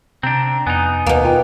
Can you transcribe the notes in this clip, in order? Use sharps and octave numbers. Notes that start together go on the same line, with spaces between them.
C3 C4 D4 A#5
F2 B3 D#4 G#5
D#2 B2 A#3
F4 G5